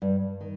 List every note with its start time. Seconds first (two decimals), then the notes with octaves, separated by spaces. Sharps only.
0.02 G2
0.41 D#3